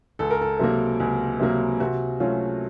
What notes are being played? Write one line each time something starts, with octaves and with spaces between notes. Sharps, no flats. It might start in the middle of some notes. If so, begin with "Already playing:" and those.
C#2 A4
A#4
A4
C3 F#3 A#3
C#2
C3 F#3 A#3
C3 F#4
F#3 A3 C#4 F4